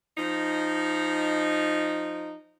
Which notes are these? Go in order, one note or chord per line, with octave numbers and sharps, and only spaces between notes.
F3 D#4